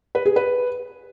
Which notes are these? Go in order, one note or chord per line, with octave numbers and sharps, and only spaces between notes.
B4
G#4
B4